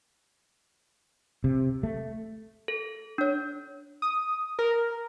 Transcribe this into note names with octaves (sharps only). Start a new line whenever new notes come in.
C3
A3
A4
D4 C#5
D#6
A#4